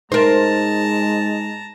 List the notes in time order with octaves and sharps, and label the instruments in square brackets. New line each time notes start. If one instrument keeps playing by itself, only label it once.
[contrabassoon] G#2 [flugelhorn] G#3 [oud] A#4 C5 [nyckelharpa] A5 A#5